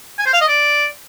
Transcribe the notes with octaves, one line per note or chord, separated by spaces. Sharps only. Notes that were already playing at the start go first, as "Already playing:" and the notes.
G#5
C5
F5
D#5
D5